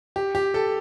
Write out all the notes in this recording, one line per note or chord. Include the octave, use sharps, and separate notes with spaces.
G4
G4
A4